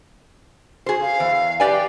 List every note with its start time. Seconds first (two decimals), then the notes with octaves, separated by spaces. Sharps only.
0.86 F#4 G#4 C5
1.01 F5
1.20 E2
1.60 G4 B4 D5 G#5
1.71 G5